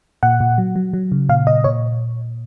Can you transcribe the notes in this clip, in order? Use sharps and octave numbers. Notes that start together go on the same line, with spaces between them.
A#2 F#5
A#2
F#3
F#3
F#3
C#3
A#2 F5
A#2 D#5
A#2 C#5